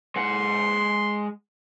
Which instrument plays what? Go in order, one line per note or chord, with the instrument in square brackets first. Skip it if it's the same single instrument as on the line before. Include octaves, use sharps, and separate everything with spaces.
[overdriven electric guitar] G#3 F#5 [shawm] C6